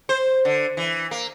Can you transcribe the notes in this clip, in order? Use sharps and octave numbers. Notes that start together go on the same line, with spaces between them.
C5
D3
E3
A#3